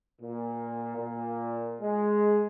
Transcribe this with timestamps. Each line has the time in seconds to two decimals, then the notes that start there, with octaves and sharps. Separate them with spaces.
0.21 A#2
0.96 A#2
1.81 G#3